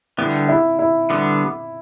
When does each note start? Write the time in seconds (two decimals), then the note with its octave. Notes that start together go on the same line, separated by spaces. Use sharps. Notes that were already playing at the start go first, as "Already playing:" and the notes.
0.18 D3 G3 B3 E4
0.49 E4
0.79 E4
1.10 D3 G3 B3